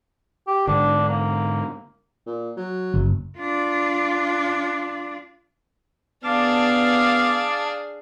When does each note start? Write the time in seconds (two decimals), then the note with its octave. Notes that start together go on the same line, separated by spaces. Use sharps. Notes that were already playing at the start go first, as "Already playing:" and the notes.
0.47 G4
0.67 G#2 D3 D4
1.09 A#3
2.26 A#2
2.57 F#3
2.94 F#1
3.38 D4 F4
6.24 B3 D4 G#4 F5 A5 D6